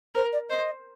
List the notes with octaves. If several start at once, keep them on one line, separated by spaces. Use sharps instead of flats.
A#4 C5
D5
C5 D#5